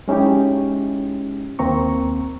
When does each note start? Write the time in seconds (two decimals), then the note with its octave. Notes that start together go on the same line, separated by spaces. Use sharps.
0.08 G#3 C#4 D#4 E4 G4
1.59 D#2 A#3 C4 A#5 C#6